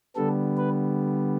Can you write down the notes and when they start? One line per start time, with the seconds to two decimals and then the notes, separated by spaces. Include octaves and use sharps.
0.16 D3 G3 B3 A4
0.57 B4